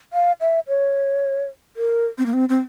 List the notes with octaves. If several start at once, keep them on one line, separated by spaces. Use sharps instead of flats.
F5
E5
C#5
A#4
C4
A#3
C4
C4